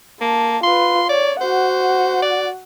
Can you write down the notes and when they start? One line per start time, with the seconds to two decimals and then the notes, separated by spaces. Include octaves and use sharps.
0.21 A#3 A5
0.63 F4 B4 C6
1.09 C#5 D5
1.41 F#4 C5 F#5
2.22 D5